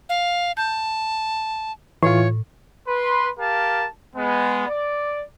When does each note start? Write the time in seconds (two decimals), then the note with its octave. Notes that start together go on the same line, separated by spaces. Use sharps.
0.09 F5
0.57 A5 G6
2.03 A2 E3 F4 C#5
2.88 B4 C6
3.39 G4 A#4 F5 A5
4.16 G#3 B3
4.67 D5